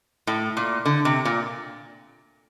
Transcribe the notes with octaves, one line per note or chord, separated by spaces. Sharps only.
A2
A#2
D3
C3
A#2